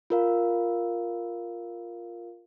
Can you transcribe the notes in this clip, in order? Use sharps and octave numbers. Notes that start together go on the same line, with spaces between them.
F4 A#4 F5